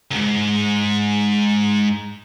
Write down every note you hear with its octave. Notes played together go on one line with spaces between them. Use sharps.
C2 G#2